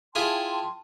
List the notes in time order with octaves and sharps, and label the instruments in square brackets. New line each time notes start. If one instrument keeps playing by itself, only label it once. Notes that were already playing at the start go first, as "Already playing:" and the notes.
[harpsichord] E4 F4 G#4 [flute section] G5 A5 C6